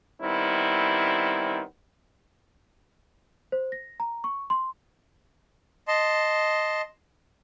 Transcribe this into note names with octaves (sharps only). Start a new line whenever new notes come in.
D#3 G3 B3 C4 E4
C5
A#6
A#5
C#6
C6
D#5 A5 C6